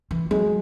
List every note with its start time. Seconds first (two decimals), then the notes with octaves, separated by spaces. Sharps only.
0.11 E3
0.31 F#3 G#3